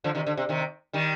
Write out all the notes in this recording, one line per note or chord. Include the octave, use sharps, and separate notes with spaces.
D3 F3
C3 D#3
D3
C3
C3 D#3
D#3 G3